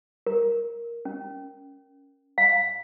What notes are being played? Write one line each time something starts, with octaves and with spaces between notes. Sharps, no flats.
A#4
C#4
F5